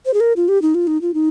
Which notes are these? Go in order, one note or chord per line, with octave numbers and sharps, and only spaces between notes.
C5
G#4
A#4
F4
G4
D#4
F4
D#4
F4
D#4